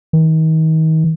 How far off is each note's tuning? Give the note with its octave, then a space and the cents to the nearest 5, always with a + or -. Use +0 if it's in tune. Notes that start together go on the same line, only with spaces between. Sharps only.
D#3 +35